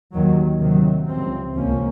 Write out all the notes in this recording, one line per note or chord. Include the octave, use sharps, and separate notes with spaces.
D#2 D#3 F#3
C3 D#3 F#3
C#2 C3 F3 C4
C#2 C3 F3 A#3 C#4